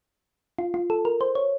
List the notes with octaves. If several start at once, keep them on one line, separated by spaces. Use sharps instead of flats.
F4
F4
A4
A#4
C5
C#5